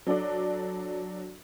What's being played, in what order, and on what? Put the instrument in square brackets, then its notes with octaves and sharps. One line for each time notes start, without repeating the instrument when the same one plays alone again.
[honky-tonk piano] F#3 D4 A4 D5